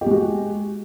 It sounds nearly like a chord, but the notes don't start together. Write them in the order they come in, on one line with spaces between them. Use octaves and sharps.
G4 G#3 F#4